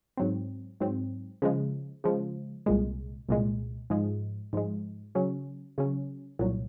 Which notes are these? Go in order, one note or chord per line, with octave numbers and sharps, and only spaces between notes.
G#2 F#3 C4
G#2 F#3 C4
C#3 F3 G#3
C#3 F3 G#3
C2 A#2 G#3
C2 A#2 G#3
G#2 F3 G#3
G#2 F3 G#3
C#3 F#3 C#4
C#3 F#3 C#4
C2 A#2 F#3